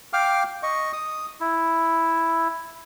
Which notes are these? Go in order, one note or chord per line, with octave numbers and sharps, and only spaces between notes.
F5 G5 D6 F6
D#5 C#6
D#6
E4